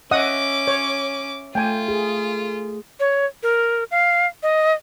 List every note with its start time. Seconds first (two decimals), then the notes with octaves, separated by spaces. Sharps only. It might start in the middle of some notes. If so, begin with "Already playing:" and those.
0.11 C#4 D#5 E5 F#5 D6 D#6
0.68 C#5
1.55 A3 F4 G5 G#5
1.88 G#4
3.00 C#5
3.43 A#4
3.91 F5
4.43 D#5